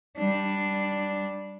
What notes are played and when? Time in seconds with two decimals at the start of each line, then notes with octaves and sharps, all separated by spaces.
0.17 G3 D4